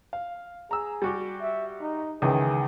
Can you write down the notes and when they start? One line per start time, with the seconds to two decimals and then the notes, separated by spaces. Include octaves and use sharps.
0.13 F5
0.71 G#4 A#5 E6
1.02 G3 F#4 G4
1.42 E5
1.81 D#4
2.22 C#2 D#3 E3 G#4